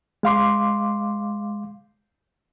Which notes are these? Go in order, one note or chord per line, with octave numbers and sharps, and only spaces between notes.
G#3 F5 C6 D6